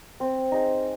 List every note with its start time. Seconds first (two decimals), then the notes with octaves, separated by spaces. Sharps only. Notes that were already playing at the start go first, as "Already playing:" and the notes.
0.20 C4
0.52 D#4 G#4